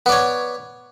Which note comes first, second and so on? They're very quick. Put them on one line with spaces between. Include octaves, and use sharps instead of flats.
B3 D5 C#5